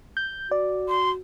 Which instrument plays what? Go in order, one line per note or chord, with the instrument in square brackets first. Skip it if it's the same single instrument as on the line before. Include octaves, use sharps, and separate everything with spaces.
[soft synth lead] G6
[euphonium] F#4 [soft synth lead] D5
[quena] C6